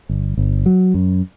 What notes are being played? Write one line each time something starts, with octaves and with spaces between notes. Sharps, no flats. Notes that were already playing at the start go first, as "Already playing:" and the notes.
G1
G1
F#3
F#2